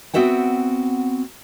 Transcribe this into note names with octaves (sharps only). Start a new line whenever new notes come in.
B3 C4 F#4 E5 F#5 G5